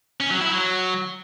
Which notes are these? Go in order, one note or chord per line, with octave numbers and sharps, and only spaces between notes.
C#4
F#3
E4
F#3